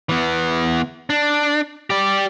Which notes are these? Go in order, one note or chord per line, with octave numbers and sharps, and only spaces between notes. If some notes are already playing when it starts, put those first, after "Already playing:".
E3 B3
D4
G4 D5